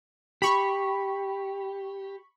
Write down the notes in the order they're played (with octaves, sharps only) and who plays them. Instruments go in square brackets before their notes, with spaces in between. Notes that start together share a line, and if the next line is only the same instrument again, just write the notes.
[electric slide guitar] G4 [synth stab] B5 C#6